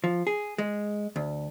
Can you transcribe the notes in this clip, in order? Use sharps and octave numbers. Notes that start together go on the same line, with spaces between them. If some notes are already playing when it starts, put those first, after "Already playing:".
F3
G#4
G#3
D2